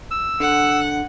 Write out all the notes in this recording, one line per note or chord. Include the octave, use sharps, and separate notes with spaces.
E6
D3 F#5